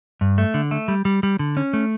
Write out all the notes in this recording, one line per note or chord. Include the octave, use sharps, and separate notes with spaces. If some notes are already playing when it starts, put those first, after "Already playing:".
G2
A3
D3
A3
G3
G3
G3
D3
C#4
A3